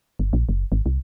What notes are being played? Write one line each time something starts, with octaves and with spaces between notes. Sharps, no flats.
G1
A#1
F#1
G#1
C2